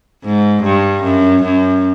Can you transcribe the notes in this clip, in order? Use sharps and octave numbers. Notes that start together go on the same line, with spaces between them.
G#2
G2
F#2
F#2